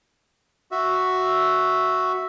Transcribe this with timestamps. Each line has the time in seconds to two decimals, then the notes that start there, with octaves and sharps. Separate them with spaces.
0.71 F#4 E5